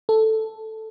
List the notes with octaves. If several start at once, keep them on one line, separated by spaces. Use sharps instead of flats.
A4